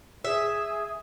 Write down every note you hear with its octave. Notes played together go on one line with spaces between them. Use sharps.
G#4 E5